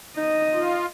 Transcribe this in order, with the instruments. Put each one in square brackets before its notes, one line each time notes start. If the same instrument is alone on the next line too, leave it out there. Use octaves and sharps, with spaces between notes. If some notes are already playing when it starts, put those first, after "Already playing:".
[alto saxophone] D#4 [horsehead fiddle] D#5
[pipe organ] F4